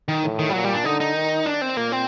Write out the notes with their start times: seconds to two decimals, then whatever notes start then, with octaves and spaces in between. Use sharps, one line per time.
0.08 D#3
0.23 A2
0.39 D#3
0.50 G3
0.54 A#2 F#3
0.64 G3
0.74 D4
0.85 D3 D#4
1.00 D#4
1.15 D#3
1.46 D4
1.61 C4
1.77 A#2 A#3
1.92 C4